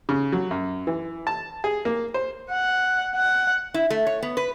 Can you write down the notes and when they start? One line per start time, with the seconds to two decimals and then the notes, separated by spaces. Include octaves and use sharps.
0.09 C#3
0.32 F#3
0.51 F#2
0.87 E3
1.27 A5
1.64 G#4
1.85 A#3
2.14 C5
2.51 F#5
3.15 F#5
3.74 E4
3.90 A3
4.07 C#5
4.23 B3
4.37 B4